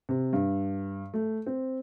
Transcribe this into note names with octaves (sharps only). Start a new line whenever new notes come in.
C3
G2
A3
C4